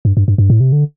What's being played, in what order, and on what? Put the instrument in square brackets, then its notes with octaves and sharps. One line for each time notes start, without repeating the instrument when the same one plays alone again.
[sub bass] G2
G2
G2
G2
A2
C3
D3